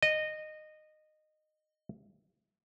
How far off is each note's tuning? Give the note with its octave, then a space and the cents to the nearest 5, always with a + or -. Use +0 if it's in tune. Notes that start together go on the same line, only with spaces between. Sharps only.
D#5 -15